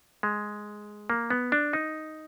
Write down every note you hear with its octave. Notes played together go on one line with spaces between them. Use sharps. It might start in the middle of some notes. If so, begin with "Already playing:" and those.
G#3
A#3
B3
D4
D#4